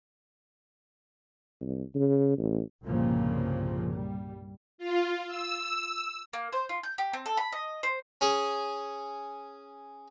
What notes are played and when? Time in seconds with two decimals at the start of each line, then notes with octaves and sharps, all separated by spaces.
1.61 C2
1.95 C#3
2.38 A1
2.84 C2 G2 A#2 C#3 F3 A#3
3.92 G3
4.78 F4
5.27 E6
6.33 A#3
6.53 C5
6.69 F4
6.83 G6
6.98 G4
7.13 C4
7.26 A4
7.37 B5
7.52 D#5
7.83 C5
8.21 C#4 G#4